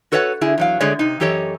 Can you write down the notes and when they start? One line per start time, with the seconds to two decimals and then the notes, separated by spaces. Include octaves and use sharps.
0.12 F#4 A4 B4 C#5 D#5 F#5
0.41 D3 E4 G#4
0.58 E2 F#3 F5
0.80 D3 G#3 A3 G#4 C#5 D5
0.99 C3 D#4
1.20 F#2 E3 G4 A4 C#5 D#5